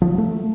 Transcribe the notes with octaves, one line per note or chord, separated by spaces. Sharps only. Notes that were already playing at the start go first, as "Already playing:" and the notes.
F3
F#3
A3